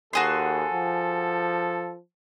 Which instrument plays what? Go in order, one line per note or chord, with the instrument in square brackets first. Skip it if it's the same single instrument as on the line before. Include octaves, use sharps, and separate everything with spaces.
[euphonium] D#2 [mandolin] F#4 G#4 C6 [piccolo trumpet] A4
[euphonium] F3